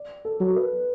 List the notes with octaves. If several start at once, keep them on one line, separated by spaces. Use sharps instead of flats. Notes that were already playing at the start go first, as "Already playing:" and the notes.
Already playing: D5
A4
F#3
A4
B4